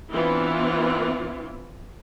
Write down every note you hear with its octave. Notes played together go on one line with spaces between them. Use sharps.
E3 B3 C4 D4 E4 F4